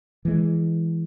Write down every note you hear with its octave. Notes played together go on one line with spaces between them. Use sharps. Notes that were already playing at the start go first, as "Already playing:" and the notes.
E3 G#3